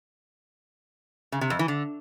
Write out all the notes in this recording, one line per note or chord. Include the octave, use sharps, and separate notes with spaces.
C#3
C3
F2
E3
D3